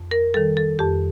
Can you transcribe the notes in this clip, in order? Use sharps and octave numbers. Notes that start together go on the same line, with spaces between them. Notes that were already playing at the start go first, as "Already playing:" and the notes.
Already playing: F2
A#4
D#3 G3 A4
A4
F2 G4